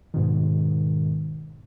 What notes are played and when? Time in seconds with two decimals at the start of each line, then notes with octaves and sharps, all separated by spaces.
0.14 G#2 B2 D#3